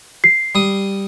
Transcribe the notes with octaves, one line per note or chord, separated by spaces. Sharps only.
C7
G3 D#6